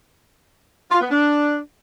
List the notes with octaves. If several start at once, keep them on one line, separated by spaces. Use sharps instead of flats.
F4
B3
D4